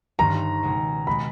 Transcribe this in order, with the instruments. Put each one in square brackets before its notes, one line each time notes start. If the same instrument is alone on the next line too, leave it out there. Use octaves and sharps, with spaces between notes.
[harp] G1 G2 D#3 G3 [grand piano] A#5
[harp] C#2 B2 G#3
[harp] B2 G#3 [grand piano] B5